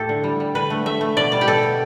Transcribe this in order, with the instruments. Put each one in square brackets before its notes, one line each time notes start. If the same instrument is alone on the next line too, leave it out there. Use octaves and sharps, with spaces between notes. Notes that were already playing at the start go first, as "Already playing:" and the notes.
Already playing: [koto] A2 A3 G4 A4
D3
G3
G3
D3 B4
A3
A3 E5
A3
B2 D5
G3 D5
G4
B2 A4
B2